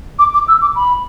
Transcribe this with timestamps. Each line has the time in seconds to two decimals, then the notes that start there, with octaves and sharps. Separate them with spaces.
0.19 D6
0.34 D6
0.48 E6
0.62 D6
0.76 B5